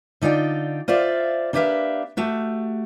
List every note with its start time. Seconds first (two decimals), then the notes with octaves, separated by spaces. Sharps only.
0.22 D3 D#4 F4 D5 G5
0.88 F4 C5 D5 E5 F5
1.53 A#3 D4 G4 B4 E5 F5
2.17 A3 F#4 G4